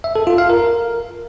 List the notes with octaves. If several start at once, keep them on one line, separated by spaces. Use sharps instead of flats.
E5
A4
F4
F5
A#4